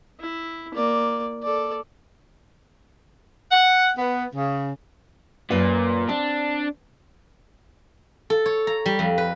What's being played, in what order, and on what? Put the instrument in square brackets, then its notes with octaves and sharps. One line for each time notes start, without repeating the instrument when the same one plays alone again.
[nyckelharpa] E4
A#3 D5
A4 D5
[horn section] F#5
B3
C#3
[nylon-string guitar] F#2 B4 F5 [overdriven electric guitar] A#2
[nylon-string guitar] C4 [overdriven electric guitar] D4
[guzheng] A4
C#5
A#5
G3
F2
B4